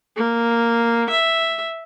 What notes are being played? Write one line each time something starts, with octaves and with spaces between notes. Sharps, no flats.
A#3
E5